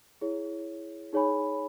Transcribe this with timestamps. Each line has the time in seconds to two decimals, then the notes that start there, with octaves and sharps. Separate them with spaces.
0.21 E4 G#4 C#5
1.13 D#4 G#4 C#5 G#5 B5